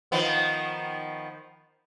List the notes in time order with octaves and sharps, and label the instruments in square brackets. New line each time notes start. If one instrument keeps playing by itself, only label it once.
[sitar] D#3 F3 B3